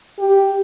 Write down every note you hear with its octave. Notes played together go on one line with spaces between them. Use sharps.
G4